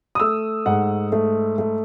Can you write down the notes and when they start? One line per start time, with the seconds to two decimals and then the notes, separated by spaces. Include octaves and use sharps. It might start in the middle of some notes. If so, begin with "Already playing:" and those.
0.15 D#6
0.20 A3 E6
0.66 G#2 F#5
1.12 A3
1.58 A3